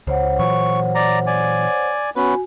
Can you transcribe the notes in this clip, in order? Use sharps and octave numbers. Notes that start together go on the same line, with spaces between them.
C#2 C5 C#5 F#5
A#2 E3 F#3 C#6
D5 A#5
D5 G#5
B3 C#4 F#4 B4 G#5